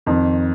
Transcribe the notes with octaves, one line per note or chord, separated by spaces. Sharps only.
F2 D#3